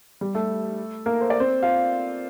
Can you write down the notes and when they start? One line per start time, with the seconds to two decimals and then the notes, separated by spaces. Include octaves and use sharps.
0.21 G3 G4
0.35 A3 A4
1.06 A#3 A#4
1.21 C5
1.30 D5
1.40 C4 C5
1.63 F4 F5